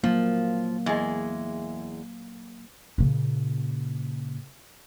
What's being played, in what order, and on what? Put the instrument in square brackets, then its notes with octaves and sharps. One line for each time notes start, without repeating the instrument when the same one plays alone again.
[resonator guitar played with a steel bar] F3 [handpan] F#3 A#3
[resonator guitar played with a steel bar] E2 G#3
[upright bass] A#2 C#3